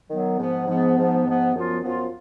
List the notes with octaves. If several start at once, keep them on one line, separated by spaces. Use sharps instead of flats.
D#3 F#3 B3
G#2 F3 B3
G#2 F3 B3
G#2 F3 B3
G#2 F3 B3
F#2 F3 B3 F4
F#2 F3 B3 F4